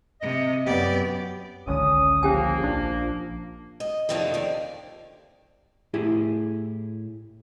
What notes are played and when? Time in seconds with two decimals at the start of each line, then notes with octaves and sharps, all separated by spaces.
0.21 C3 D#5
0.66 F#2 B3 G4 D5
1.67 G#1 C#2 D3 C#4 D#6
2.23 F3 A#3 C#4 G4 G#5
2.63 A#1 D4
3.80 D#5
4.09 F2 C3 D#3 A3 A#3 D4
4.34 D#2 C3 D5
5.94 A2 E4 G4 G#4